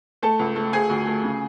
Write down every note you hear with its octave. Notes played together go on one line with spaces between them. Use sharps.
A3 A4 A5
C#2
A3
A3 G#4 G#5
D2
A3
C#3